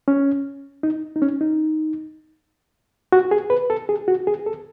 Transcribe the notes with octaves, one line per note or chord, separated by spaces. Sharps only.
C#4
D#4
D#4
C#4
D#4
F#4
G#4
B4
A4
G#4
F#4
G#4
A4